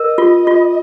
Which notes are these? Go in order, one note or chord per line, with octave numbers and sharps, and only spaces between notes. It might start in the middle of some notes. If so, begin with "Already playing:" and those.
Already playing: A#4 D#5
F4
F4